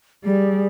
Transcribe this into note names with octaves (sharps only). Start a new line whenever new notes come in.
G3 G#4